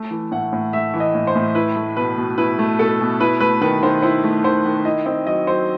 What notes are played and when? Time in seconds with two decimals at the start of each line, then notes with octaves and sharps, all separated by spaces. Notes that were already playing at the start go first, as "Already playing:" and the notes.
Already playing: A3
0.11 E3
0.31 A2 F#5
0.52 A2
0.73 A3 E5
0.94 E3
1.00 D#5
1.14 A2
1.27 C5
1.35 A2
1.55 E4 B4
1.76 A3
1.97 B2 B4
2.18 B2
2.38 E4 B4
2.59 A3
2.79 B2 A4
3.00 B2
3.20 E4 B4
3.40 A3 B4
3.61 D#3 B4
3.83 D#3 C5
4.02 E4 C5
4.24 A3
4.44 D#3 C5
4.65 D#3
4.85 E4 D#5
5.06 C4 D#5
5.26 F#3 D#5
5.47 F#3 C5